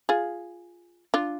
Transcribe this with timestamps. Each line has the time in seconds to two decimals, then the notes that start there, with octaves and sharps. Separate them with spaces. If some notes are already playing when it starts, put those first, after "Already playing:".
0.09 F4 G#4
1.14 D4 F4